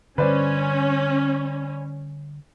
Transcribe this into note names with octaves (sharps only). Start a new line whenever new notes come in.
D3 G3 C#4 B4 C5 D5